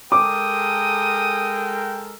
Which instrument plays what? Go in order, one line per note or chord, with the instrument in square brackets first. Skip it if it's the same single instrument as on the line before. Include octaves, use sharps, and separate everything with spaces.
[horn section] G#3 A4 A#4 [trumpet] G5 [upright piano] D6 [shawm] D#6